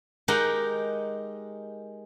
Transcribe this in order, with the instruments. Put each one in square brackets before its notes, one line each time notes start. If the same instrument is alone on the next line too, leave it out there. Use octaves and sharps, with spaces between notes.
[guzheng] G#3 D#4 G4 A#4 F#5